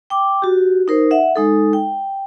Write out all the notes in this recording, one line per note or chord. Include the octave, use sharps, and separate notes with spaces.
G5 D6
F#4 G4
D#4 A#4 C5
E5 F#5
G#3 D#4 A4
G5